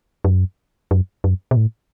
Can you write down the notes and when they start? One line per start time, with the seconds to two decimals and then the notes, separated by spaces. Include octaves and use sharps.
0.24 F#2
0.91 F#2
1.24 F#2
1.51 B2
1.56 A2